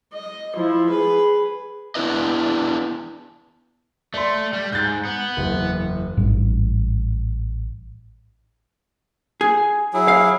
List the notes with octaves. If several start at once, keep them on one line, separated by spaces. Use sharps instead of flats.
D#5
F3 E4
G#4 B4
B3 C4 D4 E4 B4 D#5
A3 D5 C6
G3
G#2 G6 A6
B3
F#1 E2
A1 G#2 G3
G#4
F#3 E4 G#4
F5